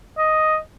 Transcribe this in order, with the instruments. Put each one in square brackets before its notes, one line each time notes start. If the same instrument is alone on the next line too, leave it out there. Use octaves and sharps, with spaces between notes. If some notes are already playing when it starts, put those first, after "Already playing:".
[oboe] D#5